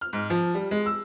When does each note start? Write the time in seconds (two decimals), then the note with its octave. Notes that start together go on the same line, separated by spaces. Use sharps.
0.01 F6
0.13 G#2
0.30 F3
0.55 G3
0.71 G#3
0.86 E6